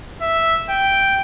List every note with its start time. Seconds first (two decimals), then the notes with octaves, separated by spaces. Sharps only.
0.22 E5
0.70 G5